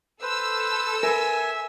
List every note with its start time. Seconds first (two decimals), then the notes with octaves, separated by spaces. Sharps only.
0.22 A4 B4 C5 E6
1.03 A#4 B4 E5 G#5